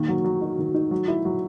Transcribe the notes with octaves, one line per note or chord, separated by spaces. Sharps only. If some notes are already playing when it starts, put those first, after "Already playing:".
Already playing: D#3 A#3
F#3
F#3
D#4
D#3
D#4
F#3
E4
F#3